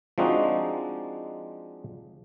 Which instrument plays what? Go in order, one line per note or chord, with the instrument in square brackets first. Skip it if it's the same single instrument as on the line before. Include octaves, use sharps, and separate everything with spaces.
[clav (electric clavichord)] F3 G#3 C4 D4 D#4 F#4